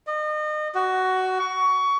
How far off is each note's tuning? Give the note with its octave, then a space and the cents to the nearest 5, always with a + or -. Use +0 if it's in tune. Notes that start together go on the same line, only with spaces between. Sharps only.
D#5 -35
F#4 +15
C#6 +20